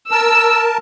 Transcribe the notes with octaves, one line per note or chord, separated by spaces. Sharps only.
A#4 A5 E6